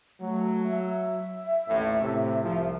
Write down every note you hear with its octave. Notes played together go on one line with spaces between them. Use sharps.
F#3 A3
E5
A1 D#2 A2
A2 C3
C2 F3